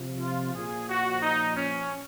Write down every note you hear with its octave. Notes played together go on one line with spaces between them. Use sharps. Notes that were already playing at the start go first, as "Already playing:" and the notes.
Already playing: C3 F3
F4
A#2 F3 G#4
F#4
D#4
C#4